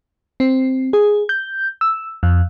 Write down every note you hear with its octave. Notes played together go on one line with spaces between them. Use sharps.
C4
G#4
G6
E6
F2